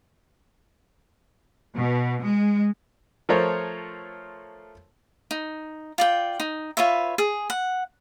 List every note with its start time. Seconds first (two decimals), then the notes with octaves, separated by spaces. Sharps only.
1.76 B2
2.22 G#3
3.29 F3 A3 F4 A#4 C5 C#5
5.31 D#4
5.98 F4 D5 G5
6.40 D#4
6.77 F4 B4 C#5 E5
7.18 G#4
7.50 F#5